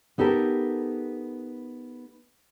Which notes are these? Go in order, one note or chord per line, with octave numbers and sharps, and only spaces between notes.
B3 D#4 G4 A4 A#4